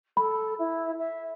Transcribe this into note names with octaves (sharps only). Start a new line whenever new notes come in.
A4 B5
E4
E5